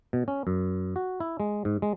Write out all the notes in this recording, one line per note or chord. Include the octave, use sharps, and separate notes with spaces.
B2
C#4
F#2
F#4
E4
G#3
G#2
G#3